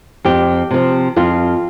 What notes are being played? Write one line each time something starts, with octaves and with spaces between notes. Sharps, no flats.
F2 G4
C3 F3
F2 F4